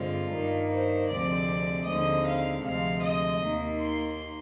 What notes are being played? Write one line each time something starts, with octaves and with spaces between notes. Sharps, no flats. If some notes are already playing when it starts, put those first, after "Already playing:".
Already playing: G2 D3 G#3 C4 F4
G2 D#3 G3 A#3
C5
D2 C3 F3 G#3 C4 D5
D#2 D3 G#3 C4 D#5
F5
D2 C3 F3 G#3 F5
D#5
D#2 D#3 A#3
C6